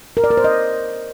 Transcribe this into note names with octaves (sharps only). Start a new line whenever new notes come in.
A#4
D5
A#4
C5
D#5